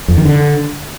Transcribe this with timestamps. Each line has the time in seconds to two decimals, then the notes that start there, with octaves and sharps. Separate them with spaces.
0.08 F2
0.17 D#3
0.25 D3